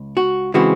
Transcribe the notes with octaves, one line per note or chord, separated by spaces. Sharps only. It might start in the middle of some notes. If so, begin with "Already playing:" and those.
Already playing: C#2
F#4
C#3 E3 G#3 C4 F#4